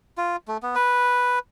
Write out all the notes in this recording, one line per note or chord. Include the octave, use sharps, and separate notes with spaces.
F4
A3
B3
B4